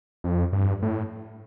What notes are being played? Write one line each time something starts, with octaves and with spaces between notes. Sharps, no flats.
F2
G2
A2